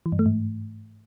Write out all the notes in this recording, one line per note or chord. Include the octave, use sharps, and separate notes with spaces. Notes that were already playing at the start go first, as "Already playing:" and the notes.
E3
G2
A3
G#2